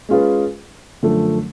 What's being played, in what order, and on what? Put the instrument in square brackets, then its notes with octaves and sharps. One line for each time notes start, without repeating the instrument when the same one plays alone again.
[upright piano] G#3 C#4 F4 G#4 B4
F#2 D3 F3 A3